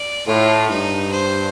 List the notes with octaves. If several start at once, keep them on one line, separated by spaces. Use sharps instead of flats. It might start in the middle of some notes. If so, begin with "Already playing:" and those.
Already playing: D5
A2 F4
G2 D#4
C5